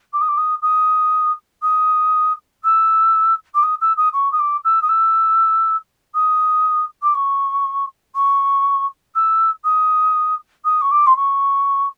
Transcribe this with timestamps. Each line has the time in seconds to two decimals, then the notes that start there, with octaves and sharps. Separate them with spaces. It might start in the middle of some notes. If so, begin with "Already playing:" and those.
0.13 D6
0.21 D#6
0.28 D6
0.37 D#6
0.62 D#6
1.62 D#6
2.63 E6
3.54 D6
3.63 D#6
3.81 E6
3.97 D#6
4.13 C#6
4.32 D#6
4.39 D6
4.64 E6
4.82 D#6
4.88 E6
6.14 D#6
7.02 D6
7.14 C#6
8.15 C#6
9.15 E6
9.64 D#6
10.65 D#6
10.81 C#6
10.91 D6
11.06 C6
11.16 C#6